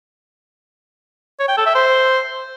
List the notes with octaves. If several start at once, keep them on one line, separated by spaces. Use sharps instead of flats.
C#5
G5
A4
E5
C5